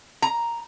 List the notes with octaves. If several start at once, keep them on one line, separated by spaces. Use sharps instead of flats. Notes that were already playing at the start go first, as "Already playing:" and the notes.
A#5